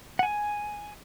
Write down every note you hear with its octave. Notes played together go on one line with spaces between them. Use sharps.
F#5
G#5